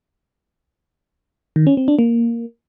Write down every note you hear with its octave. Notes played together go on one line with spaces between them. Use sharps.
D#3
C#4
C4
D4
A#3